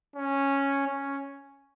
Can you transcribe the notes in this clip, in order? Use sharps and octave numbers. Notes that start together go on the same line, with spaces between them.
C#4
C#4